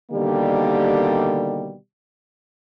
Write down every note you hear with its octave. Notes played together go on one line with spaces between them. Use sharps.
B2 D3 D#3 G3 A#3 G4